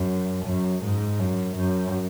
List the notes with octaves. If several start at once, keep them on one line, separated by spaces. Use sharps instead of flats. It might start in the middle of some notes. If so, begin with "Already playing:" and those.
Already playing: F#2
F#2
G#2
F#2
F#2